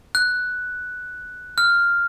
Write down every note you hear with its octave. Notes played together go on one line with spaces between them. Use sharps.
F#6
F6